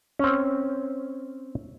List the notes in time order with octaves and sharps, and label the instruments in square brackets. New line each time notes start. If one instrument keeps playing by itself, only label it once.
[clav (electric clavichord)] C4 C#4